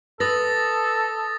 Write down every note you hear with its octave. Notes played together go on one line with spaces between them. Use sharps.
A4 B4 D#6 A6 A#6